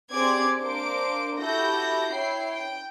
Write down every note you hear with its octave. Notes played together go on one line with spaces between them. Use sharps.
C4 G4 G#4 D5 D6 G#6
A#3 D4 C5 D6 D7
E4 F#4 G4 A4 G6 A#6
E4 C#5 G5 C7
G5